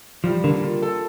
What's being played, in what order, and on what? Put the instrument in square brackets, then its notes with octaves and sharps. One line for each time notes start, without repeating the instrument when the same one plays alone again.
[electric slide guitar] F3 [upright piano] G3
[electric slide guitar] D3 [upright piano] A#3
[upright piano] F4
A4